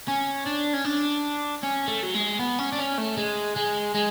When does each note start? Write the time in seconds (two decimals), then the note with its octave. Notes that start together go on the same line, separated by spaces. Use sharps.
0.08 C#4
0.46 D4
0.73 C#4
0.85 D4
1.63 C#4
1.88 A3
2.03 F#3
2.15 G#3
2.39 B3
2.59 C#4
2.72 D4
2.78 C#4
2.98 A3
3.17 G#3
3.57 G#3
3.95 G#3